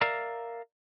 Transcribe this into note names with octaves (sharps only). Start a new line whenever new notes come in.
A#4 D5 E5 F5 A#5